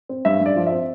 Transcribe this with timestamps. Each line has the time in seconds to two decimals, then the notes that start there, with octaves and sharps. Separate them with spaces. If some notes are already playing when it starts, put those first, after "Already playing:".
0.09 C4
0.25 G2 E5
0.41 G2 D5
0.56 F3
0.67 E5
0.72 C4